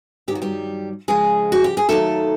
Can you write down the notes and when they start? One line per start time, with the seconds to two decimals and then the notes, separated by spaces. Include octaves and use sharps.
0.28 G2 D#3 F#3 G4
0.35 F#4
0.42 G3 G4
1.08 F2 C#3 F3 G#3 G#4
1.52 F#4
1.64 G4
1.77 G#4
1.89 D#2 D#3 F#3 A3 A4